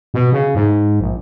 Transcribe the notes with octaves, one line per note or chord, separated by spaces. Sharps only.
B2
C#3
G#2
A#1